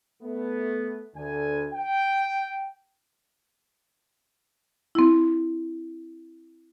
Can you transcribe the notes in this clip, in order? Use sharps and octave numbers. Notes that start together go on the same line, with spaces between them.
A3 B3
D2 D3 G#5
G5
C4 E4